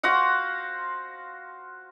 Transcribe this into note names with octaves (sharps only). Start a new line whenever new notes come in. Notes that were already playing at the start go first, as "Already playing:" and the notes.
F#4 C5 F5 F#5